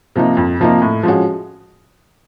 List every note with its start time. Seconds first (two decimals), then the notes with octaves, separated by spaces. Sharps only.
0.15 C3 F3 A#3 D#4
0.37 F2
0.59 C3 F3 A#3 D#4
0.82 A2
1.03 F3 G#3 C#4 F#4